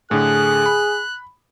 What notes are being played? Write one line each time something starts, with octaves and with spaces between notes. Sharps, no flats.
A2 D3 G#4 F#6
B5